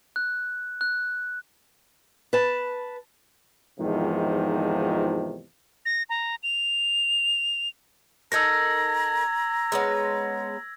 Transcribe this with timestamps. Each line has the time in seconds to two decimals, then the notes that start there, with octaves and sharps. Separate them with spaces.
0.16 F#6
0.81 F#6
2.33 B4 A5
3.80 E2 G#2 C3 D#3 F3
5.86 A#6
6.10 A#5
6.43 F7
8.32 D#4 A4 A#4 A#5 E6 G#6 A#6
9.72 G#3 B3 C#4